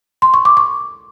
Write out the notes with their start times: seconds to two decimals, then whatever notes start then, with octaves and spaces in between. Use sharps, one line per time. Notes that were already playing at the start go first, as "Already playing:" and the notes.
0.22 C6
0.34 C#6
0.45 D6
0.57 C#6